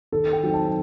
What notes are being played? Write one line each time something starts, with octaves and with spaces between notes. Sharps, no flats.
D#3 A4
G5
F#3 C4 D#4
A5